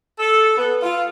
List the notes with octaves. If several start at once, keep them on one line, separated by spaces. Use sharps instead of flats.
A4
B3
F4